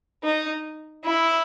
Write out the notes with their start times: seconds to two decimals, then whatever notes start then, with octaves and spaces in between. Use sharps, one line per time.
0.23 D#4
1.04 E4